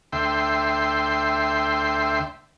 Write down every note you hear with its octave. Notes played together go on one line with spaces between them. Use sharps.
D2 E5 G5 C6